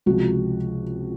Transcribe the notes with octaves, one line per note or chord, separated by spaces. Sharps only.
C#2 C3 F3 F#4